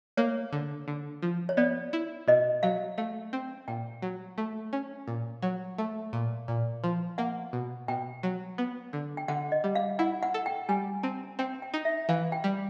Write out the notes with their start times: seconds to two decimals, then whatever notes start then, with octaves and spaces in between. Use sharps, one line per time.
0.17 A#3 C#5
0.53 D3
0.88 D3
1.22 F3
1.49 C#5
1.57 B3 D5
1.93 E4
2.28 B2 D#5
2.63 F#3 F5
2.98 A3 F5
3.33 C4
3.68 A#2 G5
4.02 F#3
4.38 A3
4.73 C#4
5.08 A#2
5.42 F#3
5.78 A3
6.13 A#2
6.48 A#2
6.84 F3
7.18 A#3 F#5
7.53 B2
7.88 B2 G5
8.23 F#3
8.58 B3
8.93 D3
9.17 G5
9.28 D3 F#5
9.52 D#5
9.64 G3
9.75 F5
9.99 E4 F#5
10.23 F#5
10.34 A4
10.46 G5
10.69 G3 G#5
11.03 C4 A5
11.39 C4 G5
11.62 G5
11.74 D#4
11.85 E5
12.09 E3 F5
12.32 G5
12.44 G3